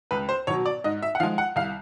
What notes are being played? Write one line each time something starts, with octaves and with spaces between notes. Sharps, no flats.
C#2 B4
C5
B2 F#3 C#5
D5
G#2 D#5
E5
F#5
F3 G#3 F5
F#5
C2 F5